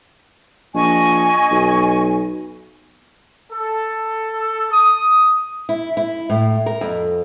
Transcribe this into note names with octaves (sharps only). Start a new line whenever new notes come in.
A#1 D#5 G#5 C#6
B1
A4
D#6
E4
E4
A2
A#4
F2